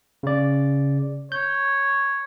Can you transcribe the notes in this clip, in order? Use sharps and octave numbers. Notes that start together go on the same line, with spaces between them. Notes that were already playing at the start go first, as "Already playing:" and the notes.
C#3 D5
C#5 G6